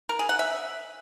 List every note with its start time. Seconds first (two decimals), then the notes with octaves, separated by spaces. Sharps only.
0.09 A#4
0.19 G#4
0.29 F#5
0.39 E5